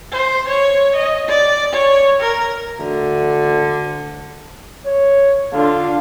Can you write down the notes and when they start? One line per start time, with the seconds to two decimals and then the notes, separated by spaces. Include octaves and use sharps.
0.12 C5
0.48 C#5
0.96 D#5
1.29 D5
1.73 C#5
2.20 A#4
2.80 D2 D3
4.87 C#5
5.54 D3 D4 F4 F5